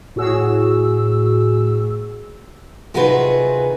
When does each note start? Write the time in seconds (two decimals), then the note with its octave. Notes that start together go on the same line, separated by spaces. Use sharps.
0.16 A2 F#4 G#4 E6
2.94 C3 D#3 F4 F#4 G#4 B4